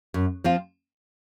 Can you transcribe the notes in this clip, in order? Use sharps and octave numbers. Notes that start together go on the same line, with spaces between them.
F#2
F3 C4 F4